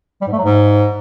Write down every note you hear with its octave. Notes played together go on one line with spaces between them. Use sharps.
G3
G#2
A3
F#3
G#2